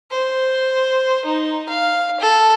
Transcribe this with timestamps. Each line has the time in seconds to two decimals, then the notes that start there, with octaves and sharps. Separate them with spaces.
0.11 C5
1.25 D#4
1.69 F5
2.20 A4